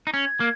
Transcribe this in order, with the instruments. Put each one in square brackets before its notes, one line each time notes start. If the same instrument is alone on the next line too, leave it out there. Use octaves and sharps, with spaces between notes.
[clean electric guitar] D#4
[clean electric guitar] C#4 [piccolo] G#6
[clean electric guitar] A#3